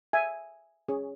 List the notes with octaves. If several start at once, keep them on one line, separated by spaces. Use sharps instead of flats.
E5 G#5
C#4 G#4 C#5